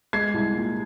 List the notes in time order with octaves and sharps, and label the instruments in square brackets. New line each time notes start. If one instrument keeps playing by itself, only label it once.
[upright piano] G#3 G#6 C7
C2
A#2